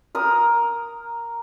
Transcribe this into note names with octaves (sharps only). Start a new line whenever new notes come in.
A#4 D#6